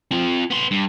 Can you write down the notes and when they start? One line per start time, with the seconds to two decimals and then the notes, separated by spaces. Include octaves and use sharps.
0.11 C4 F4
0.51 B3 C6
0.71 G2